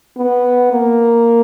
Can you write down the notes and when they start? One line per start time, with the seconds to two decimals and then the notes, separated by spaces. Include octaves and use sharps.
0.17 B3
0.72 A#3